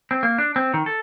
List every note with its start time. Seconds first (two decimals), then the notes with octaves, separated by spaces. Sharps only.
0.11 C4
0.23 A#3
0.38 D4
0.56 C4
0.74 D#3
0.86 A4